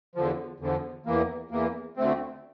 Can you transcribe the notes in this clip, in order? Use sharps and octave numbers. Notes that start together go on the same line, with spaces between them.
E2 D3 F3
E2 D3 F3
E2 E3 A#3
E2 E3 A#3
D2 D3 A3 C4